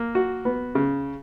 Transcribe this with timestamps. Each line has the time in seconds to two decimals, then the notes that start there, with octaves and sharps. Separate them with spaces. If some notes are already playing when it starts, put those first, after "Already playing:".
Already playing: A#3
0.15 F#4
0.45 B3
0.75 C#3